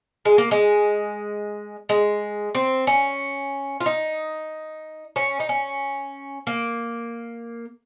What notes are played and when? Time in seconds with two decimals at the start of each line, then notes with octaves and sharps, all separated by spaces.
0.25 G#3
0.38 A#3
0.51 G#3
1.89 G#3
2.55 C4
2.87 C#4
3.80 F4
3.86 D#4
5.16 C#4
5.40 D#4
5.49 C#4
6.47 A#3